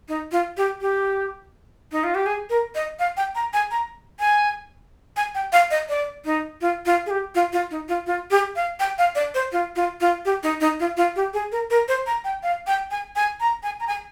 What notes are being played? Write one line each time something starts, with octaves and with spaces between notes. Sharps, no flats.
D#4
F4
G4
G4
D#4
F4
G4
G#4
A#4
D#5
F5
G5
A#5
G#5
A#5
G#5
G#5
G5
F5
D#5
D5
D#4
F4
F4
G#4
G4
F4
F4
D#4
F4
F4
G4
F5
G5
F5
D5
C5
F4
F4
F4
G4
D#4
D#4
F4
F4
G4
G#4
A#4
A#4
C5
A#5
G5
F5
G5
G#5
G#5
A#5
G#5
A#5
G#5